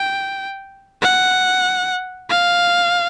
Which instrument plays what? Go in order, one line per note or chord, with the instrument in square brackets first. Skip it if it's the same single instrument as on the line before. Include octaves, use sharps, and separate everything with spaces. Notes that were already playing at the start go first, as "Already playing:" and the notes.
Already playing: [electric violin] G5
F#5
F5